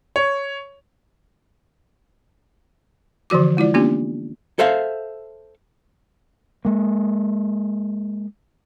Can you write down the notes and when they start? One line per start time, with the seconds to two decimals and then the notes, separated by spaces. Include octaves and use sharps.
0.16 C#5
3.30 D3 E3 F3 F#4 D6
3.57 G#3 E4 F4 D5
3.74 A#3 B3 C#4 D4 F4 G4
4.59 A4 C5 E5 F5
6.65 G#3 A#3